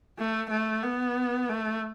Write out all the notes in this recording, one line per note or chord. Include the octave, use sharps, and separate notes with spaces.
A3
A3
B3
A3